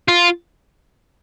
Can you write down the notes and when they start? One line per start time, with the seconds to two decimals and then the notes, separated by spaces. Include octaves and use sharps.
0.08 F4